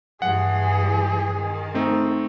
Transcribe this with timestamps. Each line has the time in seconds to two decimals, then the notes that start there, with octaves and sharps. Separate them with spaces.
0.22 G2 E3 G#4 F#5
1.34 D#3
1.74 A3 C4 D#4